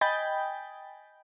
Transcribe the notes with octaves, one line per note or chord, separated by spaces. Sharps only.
D#5 G5 G#5 B5 G6 A6